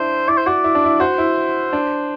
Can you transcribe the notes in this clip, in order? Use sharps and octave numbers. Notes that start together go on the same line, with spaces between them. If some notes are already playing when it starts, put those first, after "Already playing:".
Already playing: D4 E4 C5
E4 D5
C5
F#4 D5
E4
D4
E4
F#4 C5
E4
D4